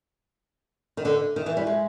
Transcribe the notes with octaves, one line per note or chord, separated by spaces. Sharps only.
D#3
D3
D#3
E3
G3
G#3